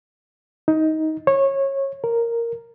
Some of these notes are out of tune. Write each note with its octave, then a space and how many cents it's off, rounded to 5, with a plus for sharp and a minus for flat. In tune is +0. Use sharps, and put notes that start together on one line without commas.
D#4 +15
C#5 -20
A#4 -5